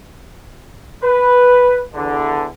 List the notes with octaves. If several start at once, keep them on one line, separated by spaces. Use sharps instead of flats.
B4
E2 D3